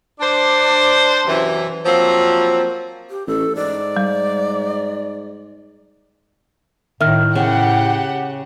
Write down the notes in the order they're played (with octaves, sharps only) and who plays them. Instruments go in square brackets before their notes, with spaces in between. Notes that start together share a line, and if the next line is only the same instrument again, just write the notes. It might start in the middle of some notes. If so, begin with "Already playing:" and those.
[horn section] D4 C5
F#2 C3 E3
F3 F#3 A#3 C4
[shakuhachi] G4
[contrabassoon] A1 [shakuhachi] A4
[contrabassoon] G#2 [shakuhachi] D5
[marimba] G3
[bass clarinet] A2 [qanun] D#3 [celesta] E5 F6
[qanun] C#3 [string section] G4 F#5